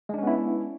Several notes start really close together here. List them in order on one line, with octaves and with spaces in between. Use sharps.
G#3 D4 C#4 B3 E4